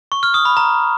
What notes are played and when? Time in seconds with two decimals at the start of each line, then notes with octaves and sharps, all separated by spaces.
0.12 C#6
0.23 F6
0.34 D#6
0.45 B5
0.57 A#5